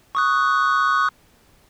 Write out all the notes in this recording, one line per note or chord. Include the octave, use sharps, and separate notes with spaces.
C#6 D#6 F#6